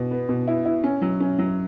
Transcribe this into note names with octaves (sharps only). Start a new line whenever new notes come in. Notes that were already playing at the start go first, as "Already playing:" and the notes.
Already playing: B2
B3
B2
E4
E4
C#4
F#3
C#4
F#3